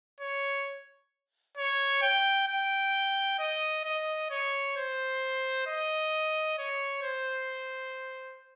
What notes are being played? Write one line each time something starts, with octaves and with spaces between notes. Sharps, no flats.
C#5
C#5
G5
G5
D#5
D#5
C#5
C5
D#5
C#5
C5